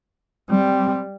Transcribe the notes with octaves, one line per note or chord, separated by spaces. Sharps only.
G3 C4